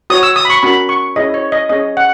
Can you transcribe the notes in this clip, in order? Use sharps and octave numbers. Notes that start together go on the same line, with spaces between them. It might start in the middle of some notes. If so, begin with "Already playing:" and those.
F#4 C#5 D#6
E6
D#6
B5
C#6
C#4 F#4 A#4 B5
C#6
C#4 E4 G#4 C#5 D#5
C#5
D#5
C#4 G#4 C#5 D#5
F#5